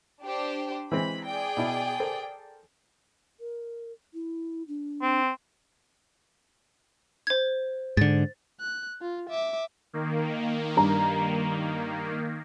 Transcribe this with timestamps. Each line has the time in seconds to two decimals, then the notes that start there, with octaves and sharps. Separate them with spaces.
0.22 D4 G4 C5
0.92 E3 G#3 C4 B5
1.26 G#4 D5 G5
1.57 B2 E4
2.00 A4 A#4 C5
3.40 A#4
4.14 E4
4.68 D4
5.02 C4
7.27 C5 G#6
7.97 G#2 D3 A6
8.61 F#6
9.01 F4
9.30 E5 D6
9.93 D#3 A#3
10.76 G2 A#5